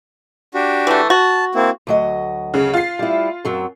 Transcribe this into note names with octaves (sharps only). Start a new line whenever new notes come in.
D4 F#4 G4
E3 A3
F#4 A5
A#3 C4 E4
D2 F#3 D#5
C#3
F4 C7
G3 E4
F#2 F#3 C4